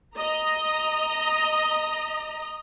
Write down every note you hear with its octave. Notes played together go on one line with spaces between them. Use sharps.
D#5 A#5